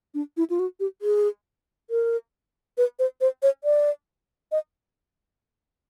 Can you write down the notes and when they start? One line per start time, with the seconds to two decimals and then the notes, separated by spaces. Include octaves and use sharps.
0.14 D4
0.37 E4
0.50 F4
0.59 F#4
0.80 G4
1.02 G#4
1.90 A#4
2.78 B4
2.99 C5
3.21 C5
3.43 C#5
3.64 D5
4.52 D#5